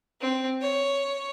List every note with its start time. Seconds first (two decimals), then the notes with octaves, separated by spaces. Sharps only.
0.21 C4
0.61 C#5